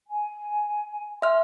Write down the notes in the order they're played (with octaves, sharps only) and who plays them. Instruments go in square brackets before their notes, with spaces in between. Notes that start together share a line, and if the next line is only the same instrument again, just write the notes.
[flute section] G#5
[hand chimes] E5 F6 [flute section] C6